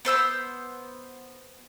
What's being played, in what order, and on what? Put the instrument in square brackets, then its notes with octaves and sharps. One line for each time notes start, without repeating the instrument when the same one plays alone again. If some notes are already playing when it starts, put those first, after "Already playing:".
[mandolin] B3 C5 E6 G6